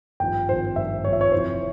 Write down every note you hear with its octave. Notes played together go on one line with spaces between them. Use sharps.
G#1 G2 F3 G5
G#1 G2 F3 C5
G#1 G2 F3 E5
G#1 G2 F3 C#5
E5
C#5
F1 F2 E3 C5